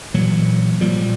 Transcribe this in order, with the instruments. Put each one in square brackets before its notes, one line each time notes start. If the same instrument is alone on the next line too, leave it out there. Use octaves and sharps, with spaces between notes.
[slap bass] A#2 E3 F#3
A#2 F3 G3